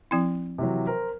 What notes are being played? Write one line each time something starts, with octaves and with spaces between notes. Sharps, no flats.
F3 C4 E4
C3 E3 F#3
A#4 C5